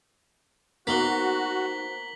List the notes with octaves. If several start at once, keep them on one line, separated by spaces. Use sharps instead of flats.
A#3 B3 D#4 F#4 C5 B6 F#7 G7